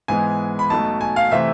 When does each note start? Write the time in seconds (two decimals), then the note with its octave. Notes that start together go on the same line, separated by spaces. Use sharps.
0.08 G#2 E3 G#3 B3 G#5
0.59 B5
0.70 B1 B2 A3 A5
1.01 G#5
1.16 F5
1.31 C3 E3 A3 C4 E5